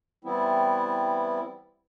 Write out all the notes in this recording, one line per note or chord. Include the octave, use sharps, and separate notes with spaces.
E3 G3 B3 C4 E4